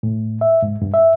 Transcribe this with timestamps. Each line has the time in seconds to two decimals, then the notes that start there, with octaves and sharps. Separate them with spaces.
0.03 A2
0.41 E5
0.62 G#2
0.82 G2
0.94 E5